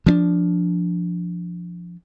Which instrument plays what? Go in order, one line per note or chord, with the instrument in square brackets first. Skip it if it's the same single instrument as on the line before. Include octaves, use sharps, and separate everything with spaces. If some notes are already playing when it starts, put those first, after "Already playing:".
[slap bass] F3 C4 D4